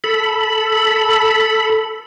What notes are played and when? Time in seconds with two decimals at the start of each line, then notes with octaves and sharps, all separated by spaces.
0.04 A4 B5